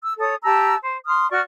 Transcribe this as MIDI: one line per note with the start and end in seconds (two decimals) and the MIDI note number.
0.02 0.12 88
0.18 0.35 69
0.18 0.35 73
0.18 0.35 87
0.43 0.75 67
0.43 0.75 81
0.43 0.75 82
0.43 0.75 88
0.82 0.98 72
1.07 1.28 84
1.07 1.28 87
1.07 1.28 89
1.30 1.40 66
1.30 1.40 74
1.30 1.40 85
1.30 1.40 89